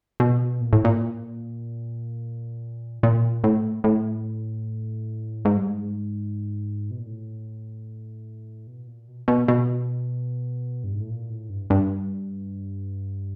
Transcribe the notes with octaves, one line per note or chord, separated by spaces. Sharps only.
B2
A#2
A2
A#2
A#2
A2
A2
G#2
G2
G#2
B2
A#2
A2
B2
A#2
B2
B2
B2
G2
G#2
A2
A#2
A2
G2
G2